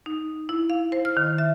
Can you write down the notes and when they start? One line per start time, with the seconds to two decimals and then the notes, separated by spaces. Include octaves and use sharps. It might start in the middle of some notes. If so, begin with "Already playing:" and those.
0.06 D#4
0.49 E4
0.70 F5
0.92 C5
1.05 F6
1.17 D#3
1.38 E5